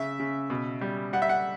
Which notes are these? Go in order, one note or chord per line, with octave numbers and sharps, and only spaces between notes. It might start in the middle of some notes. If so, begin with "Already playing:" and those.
Already playing: C#3 E5
C#3
B2
G3
G3 F#5
E5
F#5